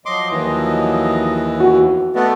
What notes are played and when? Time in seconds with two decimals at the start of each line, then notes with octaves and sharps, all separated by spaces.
0.06 F3 F#3 D#5 C6 D6
0.31 D#2 E3
1.60 F2 F#4
2.15 A3 B3 B4 D5 D#5